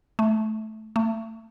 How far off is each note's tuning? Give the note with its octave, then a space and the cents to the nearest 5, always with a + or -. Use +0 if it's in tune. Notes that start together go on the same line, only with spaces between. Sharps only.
A3 -15
A3 +25